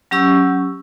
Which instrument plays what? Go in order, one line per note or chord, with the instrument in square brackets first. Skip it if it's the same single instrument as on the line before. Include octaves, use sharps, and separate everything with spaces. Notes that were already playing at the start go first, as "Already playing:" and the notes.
[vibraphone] F#3 C#4 G4 C#6 E6